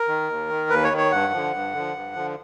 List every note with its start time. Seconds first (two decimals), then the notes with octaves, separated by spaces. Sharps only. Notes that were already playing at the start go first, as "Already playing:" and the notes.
Already playing: A#4
0.08 D#3
0.29 D#2
0.49 D#3
0.70 D#2 B4
0.84 C#5
0.91 D#3
0.97 C#5
1.12 G2 F#5
1.33 D3 F3
1.53 G2
1.73 D3 F3
1.94 G2
2.15 D3 F3